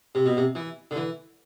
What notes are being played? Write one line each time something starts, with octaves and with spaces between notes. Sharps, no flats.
C3
B2
C3
E3
D3
E3